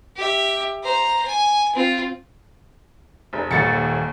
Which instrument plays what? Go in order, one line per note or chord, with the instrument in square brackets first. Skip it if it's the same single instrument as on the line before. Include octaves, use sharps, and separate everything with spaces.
[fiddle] G4 E5
C5 A#5
G#5
C4 F4
[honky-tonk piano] F1
[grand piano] D#1 [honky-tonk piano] D#2 A6 C#7